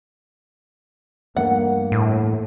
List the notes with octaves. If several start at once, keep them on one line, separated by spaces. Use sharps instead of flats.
E2 G2 A3 A#3 F#5
A2